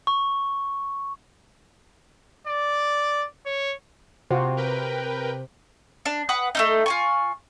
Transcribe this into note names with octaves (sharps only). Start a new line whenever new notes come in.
C#6
D5
C#5
C3 F4 F#4 C5
A#4 B4 G5
D4
B4 F#5 D#6
A3 C#4 D#4
F4 G#5 C#6